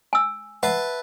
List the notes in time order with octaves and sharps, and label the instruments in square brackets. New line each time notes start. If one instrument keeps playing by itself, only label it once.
[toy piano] G#5 E6
[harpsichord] B4 E5 A5 [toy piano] F#5